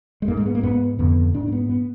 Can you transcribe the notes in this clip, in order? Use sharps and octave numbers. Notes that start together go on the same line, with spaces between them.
G#3
G#2 A#3
G#3
B3
A#3
G#2 B3
F2 D3 B3
G#2 D4
A#3
B3
B3